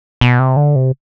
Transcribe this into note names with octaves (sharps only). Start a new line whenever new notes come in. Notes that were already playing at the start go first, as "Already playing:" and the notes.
B2
C3
D3
C3